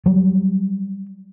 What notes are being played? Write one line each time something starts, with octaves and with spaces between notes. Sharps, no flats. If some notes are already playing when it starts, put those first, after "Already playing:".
F#3 G3